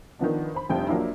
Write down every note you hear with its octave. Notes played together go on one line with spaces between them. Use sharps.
D#3 F3 B3 D4
C5 B5
F1 F2 G3 D4 G5
F3 F#3 A#3 D4 E4